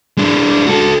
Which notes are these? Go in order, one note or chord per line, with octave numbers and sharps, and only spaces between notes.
G#3 D4
F#4 A4